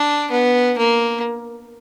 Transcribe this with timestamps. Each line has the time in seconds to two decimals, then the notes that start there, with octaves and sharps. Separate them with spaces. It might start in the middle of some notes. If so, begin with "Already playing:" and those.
Already playing: D4
0.31 B3
0.78 A#3